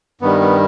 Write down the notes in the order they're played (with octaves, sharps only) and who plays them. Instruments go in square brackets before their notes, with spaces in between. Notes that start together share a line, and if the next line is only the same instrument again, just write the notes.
[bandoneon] G2 D#3 G3 B3
B3